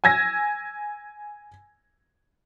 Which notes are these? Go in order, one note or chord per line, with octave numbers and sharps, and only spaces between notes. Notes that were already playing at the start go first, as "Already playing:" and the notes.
G#5 E6 G#6 A#6